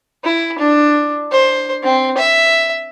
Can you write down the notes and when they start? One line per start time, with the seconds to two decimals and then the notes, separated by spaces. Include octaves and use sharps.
0.24 E4
0.58 D4
1.32 C5
1.83 C4
2.18 E5